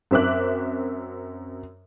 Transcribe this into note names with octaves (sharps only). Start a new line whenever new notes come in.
F#2 C4 E5 D6 F#6